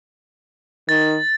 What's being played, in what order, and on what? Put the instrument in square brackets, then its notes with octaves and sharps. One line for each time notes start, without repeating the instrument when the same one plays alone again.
[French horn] D#3 [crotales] A6